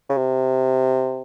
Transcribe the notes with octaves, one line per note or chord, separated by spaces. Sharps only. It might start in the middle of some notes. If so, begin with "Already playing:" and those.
C#3
C3